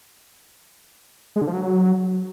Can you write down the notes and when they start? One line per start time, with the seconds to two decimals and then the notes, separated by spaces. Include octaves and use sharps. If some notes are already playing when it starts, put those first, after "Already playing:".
1.36 G#3
1.42 D3
1.47 F3
1.53 F#3